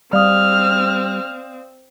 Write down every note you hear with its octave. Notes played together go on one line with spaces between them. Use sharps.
G3 C4 D5 F5 D#6 F6